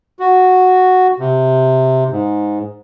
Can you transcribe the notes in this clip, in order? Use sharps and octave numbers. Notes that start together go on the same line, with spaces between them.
F#4
C3
G#2